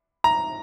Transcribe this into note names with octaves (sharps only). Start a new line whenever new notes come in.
A#5